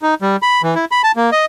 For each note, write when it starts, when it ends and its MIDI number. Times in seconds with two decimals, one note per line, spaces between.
0.02 0.15 63
0.22 0.36 55
0.42 0.62 83
0.63 0.75 52
0.75 0.85 64
0.92 1.02 83
1.04 1.12 81
1.16 1.30 58
1.32 1.45 75